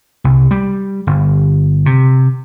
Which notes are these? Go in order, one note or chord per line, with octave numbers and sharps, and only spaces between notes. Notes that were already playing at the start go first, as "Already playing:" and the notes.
C2
G3
G1
C3